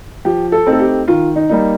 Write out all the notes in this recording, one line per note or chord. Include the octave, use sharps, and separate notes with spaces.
F3 G4
A4
A3 C4 D#4
A4
G4
D#3 F4
D#4
G3 A#3 D#4